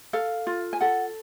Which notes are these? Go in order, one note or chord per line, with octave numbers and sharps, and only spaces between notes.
A4 F5
F4
G#5
A4 F#5